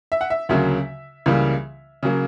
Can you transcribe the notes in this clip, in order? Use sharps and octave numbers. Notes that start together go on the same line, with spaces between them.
E5
F#5
E5
D2 C#3 F#3 A#3 E5
C#2 C#3 E3 G3 A#3
C#3 F#3 A#3